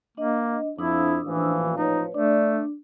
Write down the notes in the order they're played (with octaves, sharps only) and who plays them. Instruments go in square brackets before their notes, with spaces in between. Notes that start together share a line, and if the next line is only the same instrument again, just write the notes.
[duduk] A#3 [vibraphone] D4 D#5
[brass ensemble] F2 F3 [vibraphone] D4 D#6 E6 [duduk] E4
[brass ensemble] A1 A#2 F3 [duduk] E3
[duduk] D#4 [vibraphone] B4 C#5
[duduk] A3 [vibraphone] D4 [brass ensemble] D5